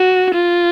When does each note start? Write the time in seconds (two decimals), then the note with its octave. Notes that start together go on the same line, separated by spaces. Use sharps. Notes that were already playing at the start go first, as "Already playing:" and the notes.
Already playing: F#4
0.34 F4